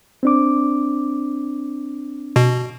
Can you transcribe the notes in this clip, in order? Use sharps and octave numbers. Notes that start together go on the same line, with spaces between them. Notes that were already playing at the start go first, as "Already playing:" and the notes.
C4 D4 D6
B2